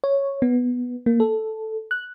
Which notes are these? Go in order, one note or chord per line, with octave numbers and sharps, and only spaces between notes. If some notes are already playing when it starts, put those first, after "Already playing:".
C#5
B3
A#3
A4
F#6